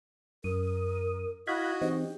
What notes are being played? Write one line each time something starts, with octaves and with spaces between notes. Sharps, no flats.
F#2 A#4 D#6
E4 F#4 D#5 F5 B5 F#6 G#6
E3 C4 D#4 G4